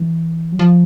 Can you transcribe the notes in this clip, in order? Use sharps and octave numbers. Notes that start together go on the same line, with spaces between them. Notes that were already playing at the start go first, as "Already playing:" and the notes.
Already playing: E3
F#3
F3